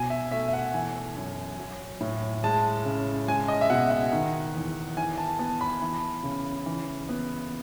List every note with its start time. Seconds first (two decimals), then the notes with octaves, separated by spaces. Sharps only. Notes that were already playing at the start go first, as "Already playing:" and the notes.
Already playing: B2 G#5
0.10 E5
0.31 A3 E5
0.49 E5
0.53 F#5
0.74 E3 G#5
1.16 F#2
1.59 F#3
2.01 A2
2.44 G#3 A5
2.85 C#3
3.28 G#3 G#5
3.48 D#5
3.61 E5
3.70 B2 F#5
3.91 F#5
4.12 D#3
4.55 E2
4.97 E3 G#5
5.18 A5
5.39 B3 A5
5.61 B5
5.82 E3
6.23 C#3
6.66 E3
7.09 B3